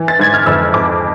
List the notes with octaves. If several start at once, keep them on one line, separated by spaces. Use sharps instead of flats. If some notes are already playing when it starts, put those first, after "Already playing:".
Already playing: E3
A6
G#2 G#6
F6
F2 E6
F2 D6